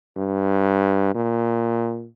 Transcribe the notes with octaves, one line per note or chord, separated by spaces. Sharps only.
G2
A#2